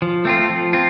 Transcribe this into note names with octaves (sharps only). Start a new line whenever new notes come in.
F3
A3 C4 F4
F3
C4 F4